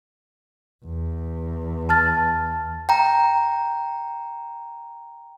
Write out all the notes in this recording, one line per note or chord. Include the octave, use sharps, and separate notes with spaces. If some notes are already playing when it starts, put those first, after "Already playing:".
E2
A5 F6 A6
G5 A#5